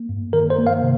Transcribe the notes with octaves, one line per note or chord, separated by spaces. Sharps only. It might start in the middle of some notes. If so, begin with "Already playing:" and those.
Already playing: A#3
G2
D#3 A#4
C5
A#3
F5
C3